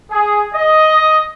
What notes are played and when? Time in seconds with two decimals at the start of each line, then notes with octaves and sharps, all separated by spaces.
0.11 G#4
0.54 D#5